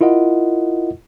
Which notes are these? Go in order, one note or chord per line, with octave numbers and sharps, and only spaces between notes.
E4 F4 A#4 D#5 F#5